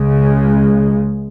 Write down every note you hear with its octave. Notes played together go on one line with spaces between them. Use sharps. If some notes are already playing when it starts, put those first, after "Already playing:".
Already playing: C#2 C#3 G#3